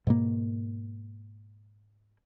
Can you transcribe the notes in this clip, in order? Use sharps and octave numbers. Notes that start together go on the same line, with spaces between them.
G#2 B2 A#3